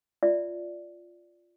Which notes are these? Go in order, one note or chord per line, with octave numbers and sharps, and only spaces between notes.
F4 D5 E5